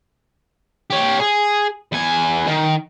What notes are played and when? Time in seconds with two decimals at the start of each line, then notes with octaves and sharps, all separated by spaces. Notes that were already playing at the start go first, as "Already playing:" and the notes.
0.90 G4 C#5
1.20 G#4
1.92 E2 G#5
2.47 D#3